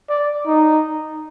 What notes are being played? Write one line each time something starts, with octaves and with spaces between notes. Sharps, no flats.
D5
D#4